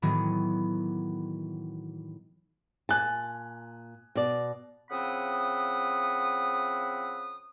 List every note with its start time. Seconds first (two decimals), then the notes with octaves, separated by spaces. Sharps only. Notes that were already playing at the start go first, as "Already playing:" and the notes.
0.02 A2 D#3 E3 F#3 B3
2.89 A#2 G#5 A5 F#6
4.15 B2 D5
4.90 C#3 F3 C4 F#5 B5 D#6